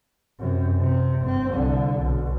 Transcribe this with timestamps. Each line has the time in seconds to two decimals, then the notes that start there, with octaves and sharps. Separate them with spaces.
0.39 F#2 C3
0.80 C3
1.21 G1 C4
1.53 C2 D3
2.01 B1